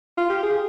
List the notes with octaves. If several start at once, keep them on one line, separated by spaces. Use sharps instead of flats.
F4
G4
G#4